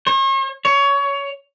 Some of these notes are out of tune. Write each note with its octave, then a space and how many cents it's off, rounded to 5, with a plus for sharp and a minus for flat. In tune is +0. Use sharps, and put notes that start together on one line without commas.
C#5 -45
C#5 +20